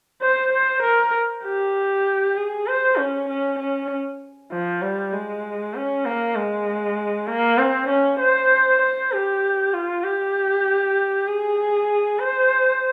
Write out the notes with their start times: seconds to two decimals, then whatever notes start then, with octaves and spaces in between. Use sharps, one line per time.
0.22 C5
0.53 C5
0.83 A#4
1.45 G4
2.36 G#4
2.67 C5
2.98 C#4
3.29 C#4
3.60 C#4
4.52 F3
4.82 G3
5.13 G#3
5.75 C#4
6.05 A#3
6.36 G#3
7.28 A#3
7.58 C4
7.89 C#4
8.20 C5
8.82 C5
9.12 G4
9.74 F4
10.04 G4
11.28 G#4
12.19 C5